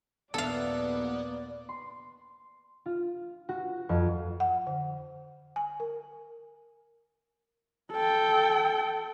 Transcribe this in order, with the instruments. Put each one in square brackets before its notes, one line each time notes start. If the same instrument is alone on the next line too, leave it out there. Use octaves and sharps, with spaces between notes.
[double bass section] A#1 D#2 A#3 [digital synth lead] B3 [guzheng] A4 F5 [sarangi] D5
[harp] C6
F4
F#4
F2
[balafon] F#5
D3
G#5
A#4
[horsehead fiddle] A4 G5